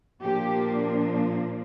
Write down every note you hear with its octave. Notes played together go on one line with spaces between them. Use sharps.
A#2 F3 A#3 D4 G4